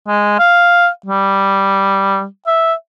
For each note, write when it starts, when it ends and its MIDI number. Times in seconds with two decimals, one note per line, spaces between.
0.07 0.38 56
0.39 0.88 77
1.06 2.25 55
2.47 2.73 76